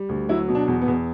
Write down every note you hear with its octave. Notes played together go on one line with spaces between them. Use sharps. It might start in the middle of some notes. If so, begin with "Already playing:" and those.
Already playing: G3
D2
F#3 E4
B2
D4
E2
B3
E2